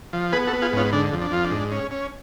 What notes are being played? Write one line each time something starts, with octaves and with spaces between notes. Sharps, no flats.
F3
B3 G#4 B4
F#4 A4
B3
F4 G#4
G#2 C#4 F4
D3 D4
F2
D4
F2 F4
D4
G#2
C#4
C#4